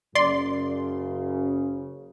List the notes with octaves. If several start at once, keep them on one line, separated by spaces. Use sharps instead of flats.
F#1 F#2 C#3 D5 C6